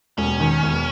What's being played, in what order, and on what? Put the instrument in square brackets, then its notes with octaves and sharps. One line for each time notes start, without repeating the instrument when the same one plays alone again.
[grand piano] E1 [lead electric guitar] C#4
[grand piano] D#3
E1